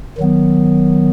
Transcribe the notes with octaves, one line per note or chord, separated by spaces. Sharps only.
D#3 F#3 B3